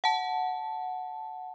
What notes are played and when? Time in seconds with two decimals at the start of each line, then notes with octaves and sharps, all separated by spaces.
0.04 F#5 A5